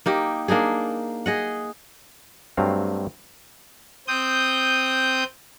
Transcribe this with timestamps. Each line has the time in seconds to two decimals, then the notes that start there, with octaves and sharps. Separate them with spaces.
0.06 A#3 D#4 G4
0.48 A#3 D4 D#4 G#4
1.26 G#4 D#5 F#5
2.57 G2 F#3 A3 C4 F5
4.08 C4 D#6 G6